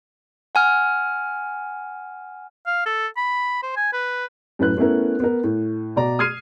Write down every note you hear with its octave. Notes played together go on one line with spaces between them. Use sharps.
F#5 G#5 F6
F5
A4
B5
C5
G#5
B4
F#2 A2 B4 F#6
A3 B3 C#4 E4 A#4
B3 A#4
A2
B2 D5 A#5
D#6 F6 G#6 C7 D#7